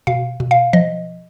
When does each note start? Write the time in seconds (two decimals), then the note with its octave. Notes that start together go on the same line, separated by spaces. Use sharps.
0.07 B2 F5
0.40 B2
0.51 F5
0.73 F3 D#5